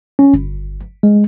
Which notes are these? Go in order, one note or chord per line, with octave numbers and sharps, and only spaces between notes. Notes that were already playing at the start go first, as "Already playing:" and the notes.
C#4
G1
G#3